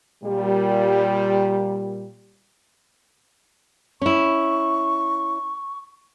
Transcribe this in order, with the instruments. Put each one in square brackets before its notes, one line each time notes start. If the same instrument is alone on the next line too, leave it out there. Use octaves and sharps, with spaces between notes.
[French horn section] A#2 G3
[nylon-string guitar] C#4 E4 [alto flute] C#6